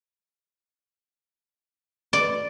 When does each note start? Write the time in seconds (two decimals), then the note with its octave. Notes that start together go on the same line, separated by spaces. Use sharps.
2.13 D5